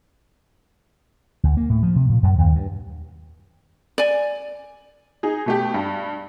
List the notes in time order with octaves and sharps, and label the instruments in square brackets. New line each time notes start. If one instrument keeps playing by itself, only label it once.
[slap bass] D2
A#3
A2
F3
C3
A#2
F#2
D#2
G2
[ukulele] D5 G#5
[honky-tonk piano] D#4 G#4
B2 A3 G4
G2